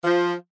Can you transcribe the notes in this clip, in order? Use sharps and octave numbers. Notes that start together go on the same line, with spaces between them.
F3